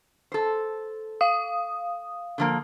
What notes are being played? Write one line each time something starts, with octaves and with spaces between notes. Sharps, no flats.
A4 C5
F5 D#6
D3 F3 A#3